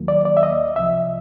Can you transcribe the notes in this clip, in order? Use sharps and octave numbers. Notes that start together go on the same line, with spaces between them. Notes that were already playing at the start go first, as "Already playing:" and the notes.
Already playing: D#2 D#3 F#3 A#3
D5
D5
E5
D#5
C2 C3 F3 E5